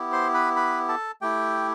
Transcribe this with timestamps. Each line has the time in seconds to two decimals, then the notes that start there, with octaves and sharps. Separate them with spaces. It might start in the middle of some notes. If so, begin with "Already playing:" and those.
Already playing: B3 E4 G4
0.12 C5 C6
0.34 B4 B5
0.56 B4 B5
0.88 A4 A5
1.21 A3 E4 G4 G5